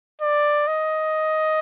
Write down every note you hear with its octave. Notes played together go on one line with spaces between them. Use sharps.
D5
D#5